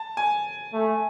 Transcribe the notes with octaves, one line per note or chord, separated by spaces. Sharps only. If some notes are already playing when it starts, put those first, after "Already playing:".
Already playing: A5
G#5
A3